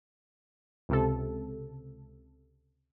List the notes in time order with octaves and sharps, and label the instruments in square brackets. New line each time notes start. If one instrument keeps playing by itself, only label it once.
[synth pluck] C#2 C3 A4